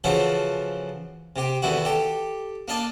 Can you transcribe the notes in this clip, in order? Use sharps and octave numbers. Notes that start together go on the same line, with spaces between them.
C#3 E3 F3 F#4 A4 C5
C3 G4
E2 D3 D#3 E4 F#4
G4 A4
A#3 D4 D#5 A5